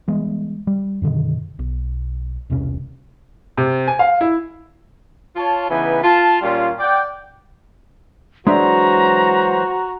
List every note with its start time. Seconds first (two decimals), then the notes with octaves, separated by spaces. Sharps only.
0.08 E3 G3 G#3 B3
0.67 G3
1.02 F#2 B2 D3 D#3
1.59 B1
2.50 E1 C2 C3 C#4
3.57 C3
3.88 G#5
3.99 F5
4.21 E4
5.36 F4 C#5 A5
5.69 C#3 E3 B3 D#4 B4 G#5
6.04 F4 A5
6.42 A#2 G3 C#4 F4
6.80 D5 F#5 G5
8.47 E3 F#3 G#3 D4 F#4 C5 E5 A#5